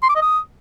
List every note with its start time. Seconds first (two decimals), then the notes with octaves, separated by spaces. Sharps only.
0.03 C6
0.09 D6
0.15 D#5
0.22 D#6